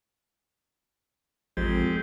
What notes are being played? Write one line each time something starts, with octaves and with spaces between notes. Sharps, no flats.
A1 F2 G#3 C4 G4